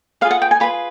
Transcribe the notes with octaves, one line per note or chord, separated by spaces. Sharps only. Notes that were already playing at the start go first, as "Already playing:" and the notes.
F4 G#4 B4 F5
F#5
G5
G#5
F4 G#4 B4 B5